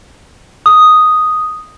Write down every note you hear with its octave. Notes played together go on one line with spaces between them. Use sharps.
D#6